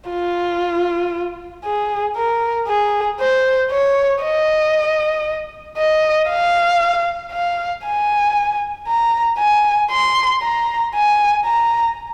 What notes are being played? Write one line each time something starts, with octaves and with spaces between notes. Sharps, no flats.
F4
G#4
A#4
G#4
C5
C#5
D#5
D#5
F5
F5
G#5
A#5
G#5
C6
A#5
G#5
A#5